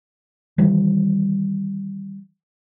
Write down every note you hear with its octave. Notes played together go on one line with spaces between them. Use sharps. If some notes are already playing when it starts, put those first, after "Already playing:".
D#3 E3 G3